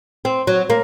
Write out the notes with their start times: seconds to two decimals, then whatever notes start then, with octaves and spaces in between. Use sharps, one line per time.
0.25 C4
0.47 F#3
0.70 A#3